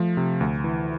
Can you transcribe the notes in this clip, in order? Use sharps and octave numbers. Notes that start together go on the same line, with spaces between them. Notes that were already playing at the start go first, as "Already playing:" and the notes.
Already playing: F3 A3
C3
D2
E3